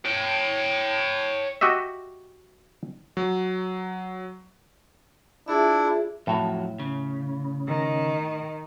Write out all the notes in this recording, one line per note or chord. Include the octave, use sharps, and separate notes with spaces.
C#5 G5
F#4 G4 D#5 E5
F#3
D4 E4 F4 G#4 E5
F2 A2 F#3
C#3
D#3